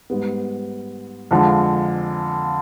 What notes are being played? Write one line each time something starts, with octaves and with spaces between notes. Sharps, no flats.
G#2 G3 B3
F2 D3 F3 G#3